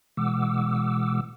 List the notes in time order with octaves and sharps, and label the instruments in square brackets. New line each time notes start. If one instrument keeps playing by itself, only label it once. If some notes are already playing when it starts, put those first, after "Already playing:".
[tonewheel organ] B2 E3 G#3 F#5 D6 E6